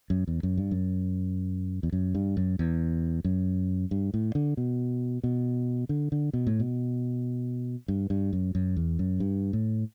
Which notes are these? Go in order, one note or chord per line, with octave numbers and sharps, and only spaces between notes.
F#2
E2
F#2
G2
F#2
E2
F#2
G2
F#2
E2
F#2
G2
A2
D3
B2
B2
D3
D3
B2
A2
B2
G2
G2
F#2
F#2
E2
F#2
G2
A2